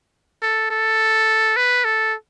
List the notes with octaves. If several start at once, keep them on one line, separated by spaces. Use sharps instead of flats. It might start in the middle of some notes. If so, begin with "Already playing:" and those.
A4
A4
B4
A4